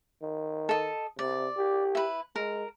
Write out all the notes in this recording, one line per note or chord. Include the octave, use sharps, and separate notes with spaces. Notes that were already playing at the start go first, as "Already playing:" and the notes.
D#3
A4 D#5
C3 D5
G4
E4 B4
G#3 A#4